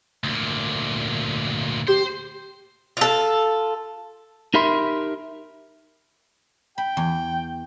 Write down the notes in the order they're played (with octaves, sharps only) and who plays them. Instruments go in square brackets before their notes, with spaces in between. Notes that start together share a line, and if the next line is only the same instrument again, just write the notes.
[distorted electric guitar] D2 A#2
[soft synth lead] G4 [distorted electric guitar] C5
[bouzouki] F4 A4
[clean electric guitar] D#4 G4 A#4 E5 B5 C6
[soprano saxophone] G5 [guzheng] B5
[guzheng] E2